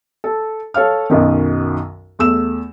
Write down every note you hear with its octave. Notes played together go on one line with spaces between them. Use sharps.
A4
A4 C#5 F5 F6
B1 F#2 D#3
E2 A3 E6 E7